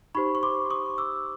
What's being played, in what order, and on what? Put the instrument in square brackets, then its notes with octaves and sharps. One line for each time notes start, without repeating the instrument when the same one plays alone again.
[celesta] D#4 G4 C5 B5 C#6
C#6
C6 D6
C#6 D#6
D6 E6